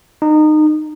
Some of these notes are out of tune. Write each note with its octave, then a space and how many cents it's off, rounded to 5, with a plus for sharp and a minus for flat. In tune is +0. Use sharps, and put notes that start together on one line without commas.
D#4 -25